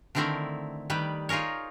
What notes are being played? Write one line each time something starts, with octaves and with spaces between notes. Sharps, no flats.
D3 D#3 A3 C4 E4 A#4
D#3 G3 B4
D#4 F4 G#4 A#4 C#5